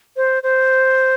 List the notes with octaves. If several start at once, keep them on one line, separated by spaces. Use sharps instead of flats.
C5
C5